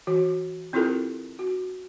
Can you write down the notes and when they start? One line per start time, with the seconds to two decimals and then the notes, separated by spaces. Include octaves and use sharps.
0.07 E3 F#4
0.73 C4 E4 F4 G4 A4 A#4
1.39 F#4